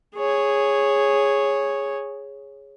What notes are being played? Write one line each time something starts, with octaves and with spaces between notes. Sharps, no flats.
G#4 C#5